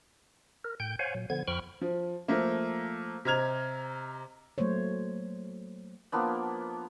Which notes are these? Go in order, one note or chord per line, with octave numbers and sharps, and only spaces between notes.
A#4
A2 G5 G6
C5 C#5 F5 F#5 G#5
A#2 F#3
D3 F3 B3 G#6
F2 F3 G5 B5 C#6 F6
F3
F3 A3 A#3
C3 D#5 A#5 F6 G#6 F7
F#3 A3 A#3 C5 C#5
F3 A#3 B3 D4